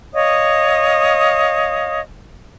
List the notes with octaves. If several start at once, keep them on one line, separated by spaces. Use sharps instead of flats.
C#5 D#5 F5 D#6